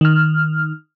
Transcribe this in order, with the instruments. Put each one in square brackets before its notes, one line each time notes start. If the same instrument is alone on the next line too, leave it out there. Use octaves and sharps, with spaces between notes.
[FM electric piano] D#3 F6